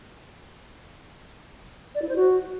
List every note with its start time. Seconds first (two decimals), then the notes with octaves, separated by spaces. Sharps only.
1.95 D5
2.02 E4
2.09 C5
2.16 F#4